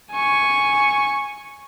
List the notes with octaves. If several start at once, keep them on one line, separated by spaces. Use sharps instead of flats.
G#5 C#6